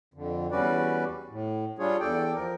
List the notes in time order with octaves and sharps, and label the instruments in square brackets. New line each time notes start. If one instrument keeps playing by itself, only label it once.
[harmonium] F2 D3
E2 G3 C#4 F#4 B4 D5
A2
G3 D4 F4 G#4 C#5
E2 A4 D5 G5
F3 A#4